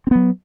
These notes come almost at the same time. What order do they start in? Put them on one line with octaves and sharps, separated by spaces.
C4 B3 F#3